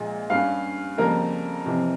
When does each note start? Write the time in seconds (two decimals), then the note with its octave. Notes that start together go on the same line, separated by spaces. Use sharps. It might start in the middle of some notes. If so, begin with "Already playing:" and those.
Already playing: A#1 A#2 G#3
0.30 G2 G3 C#4 F5
0.98 F2 C#3 G3 A#3 A#4
1.65 F2 C3 E3